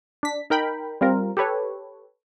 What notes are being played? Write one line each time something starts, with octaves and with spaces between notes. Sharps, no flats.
D4 B6
D#4 A#4 G5 B5
G3 C4 F4 A#4
G4 A4 B4 C#5